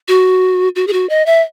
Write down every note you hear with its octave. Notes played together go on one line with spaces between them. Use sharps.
F#4
F#4
G#4
F#4
D#5
E5